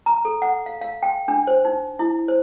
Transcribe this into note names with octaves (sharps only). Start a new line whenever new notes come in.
A#5
A4
F#5
F5
F5
G5
D4
C5
D#4
E4
C5